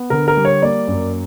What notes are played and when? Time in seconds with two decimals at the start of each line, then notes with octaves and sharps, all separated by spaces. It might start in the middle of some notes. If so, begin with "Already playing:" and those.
Already playing: B3
0.10 D3 A#4
0.28 A#4
0.37 G3
0.45 C#5
0.62 A#3 D5
0.88 F#2